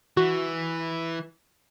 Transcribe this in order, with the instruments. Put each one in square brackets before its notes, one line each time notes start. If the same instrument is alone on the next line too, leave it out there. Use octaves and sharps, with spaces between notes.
[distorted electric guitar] E3 [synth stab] F#4